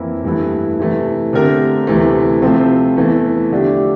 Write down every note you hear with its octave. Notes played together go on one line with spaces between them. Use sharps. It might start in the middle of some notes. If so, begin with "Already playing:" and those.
Already playing: F2 E3 A#3 E4
G2 E3 A3 E4
C3 E3 A3
D3 A3 C4 G4 A#4
D2 C3 E3 A3
C3 F3 A3 C4
E2 E3 A3
D3 F3 A3 D4 G4